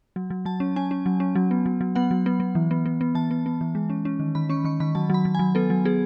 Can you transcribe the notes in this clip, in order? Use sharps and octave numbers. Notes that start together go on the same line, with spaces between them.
F#3
F#3
F#3 A5
C#4
C#4 G#5
C#4
F#3
C#4
F#3
B3
F#3
F#3
B3 F#5
F#3
B3
B3
E3
B3
B3
B3
E3 A5
B3
B3
E3
G#3
C#4
C#4
D#3
D#3 B5
C#4 C#6
D#3 C#6
D#3 B5
F#3 A5
F#3 B5
F#3
G#5
F#3
B3 A4
F#3
B3 G#4